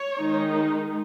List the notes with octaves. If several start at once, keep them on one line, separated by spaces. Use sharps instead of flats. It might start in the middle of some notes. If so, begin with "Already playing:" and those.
Already playing: C#5
D#3 G#3 D#4